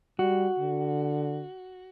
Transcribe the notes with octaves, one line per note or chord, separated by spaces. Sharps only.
G3 F#4
D3